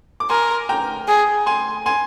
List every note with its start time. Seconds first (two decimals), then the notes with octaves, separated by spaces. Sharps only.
0.20 D6
0.30 A#4 G#5 C6
0.69 G5 A#5
1.08 G#4
1.46 G#5 C6
1.86 G#5 C6